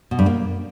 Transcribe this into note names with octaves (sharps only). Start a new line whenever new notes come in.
B2
G2
A#3